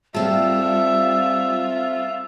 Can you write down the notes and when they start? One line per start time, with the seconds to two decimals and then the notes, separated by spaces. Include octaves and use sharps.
0.14 G3 C4 F4 A4 E5